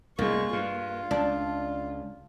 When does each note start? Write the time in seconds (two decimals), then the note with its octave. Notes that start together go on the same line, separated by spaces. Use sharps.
0.19 C2 F#2 A2 G#3 A#3 C#6
0.53 G2 F4
1.11 C#2 D4